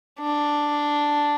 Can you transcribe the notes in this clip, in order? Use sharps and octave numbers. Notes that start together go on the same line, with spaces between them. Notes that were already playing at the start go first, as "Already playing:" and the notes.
D4